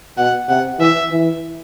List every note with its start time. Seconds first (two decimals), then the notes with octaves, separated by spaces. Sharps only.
0.17 B2 F#5
0.49 C3 F#5
0.79 E3 E5
1.11 E3